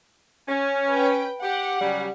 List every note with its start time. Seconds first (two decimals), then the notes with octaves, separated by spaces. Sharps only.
0.49 C#4
0.91 B4 G5
1.43 G4 F#5
1.81 C#3 F#3 G3